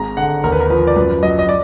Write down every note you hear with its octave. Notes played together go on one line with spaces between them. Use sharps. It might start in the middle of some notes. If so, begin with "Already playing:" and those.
Already playing: G#1 G#3 A#5
D3 F#5
D#2 A#4
B4
A#4
F3 B4
D5
F#2 B4
F#3 D#5
D#5
D5